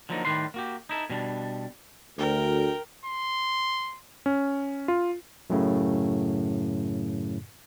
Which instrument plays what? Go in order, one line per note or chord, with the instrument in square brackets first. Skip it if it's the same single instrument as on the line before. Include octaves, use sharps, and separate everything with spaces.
[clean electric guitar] D3 F3 F#3 A#3 D#4
A2 D#3 G3 B4 C6
A#3 F#4 G4
D#4 E4 A4
B2 G3 D4
[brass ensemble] D2 [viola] A#4 G5
[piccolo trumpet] C6
[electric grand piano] C#4
F4
[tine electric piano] F#2 A2 C#3